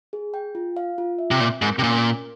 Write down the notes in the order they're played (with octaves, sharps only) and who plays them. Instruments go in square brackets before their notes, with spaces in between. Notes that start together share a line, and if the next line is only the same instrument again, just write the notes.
[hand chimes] G#4
G5
F4
F5
F4
E5
[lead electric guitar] C3
[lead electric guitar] A#2 [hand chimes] C4
[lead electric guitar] G#2 [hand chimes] A#4
[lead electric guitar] C3
[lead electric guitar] A#2 [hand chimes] C#4
[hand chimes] A#4